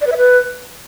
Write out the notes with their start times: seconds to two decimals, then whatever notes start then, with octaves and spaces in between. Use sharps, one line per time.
0.01 D5
0.07 B4
0.12 E5
0.17 B4